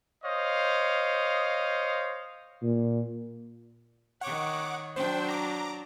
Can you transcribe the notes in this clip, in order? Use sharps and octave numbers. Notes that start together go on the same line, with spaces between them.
C5 C#5 D#5 F5
A#2
D#3 C#5 F#5 D6
F#3 D4 C5 G5
A#5 D6